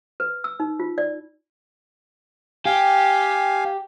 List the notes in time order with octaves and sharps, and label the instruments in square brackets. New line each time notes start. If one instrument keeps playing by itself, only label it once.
[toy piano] B4
E6
D#4
F4
D5
[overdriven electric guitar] G4 [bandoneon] F5 G#5